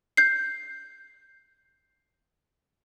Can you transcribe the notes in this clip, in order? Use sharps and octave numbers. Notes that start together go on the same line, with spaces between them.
G6 C7